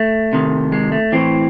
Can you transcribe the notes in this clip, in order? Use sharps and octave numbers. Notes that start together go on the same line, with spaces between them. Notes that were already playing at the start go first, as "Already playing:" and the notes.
Already playing: A3
C3 D#3
G#3
A3
A2 E3 C4